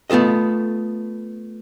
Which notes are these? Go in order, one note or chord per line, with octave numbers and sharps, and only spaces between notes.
A3 B3 F4 A4 D#5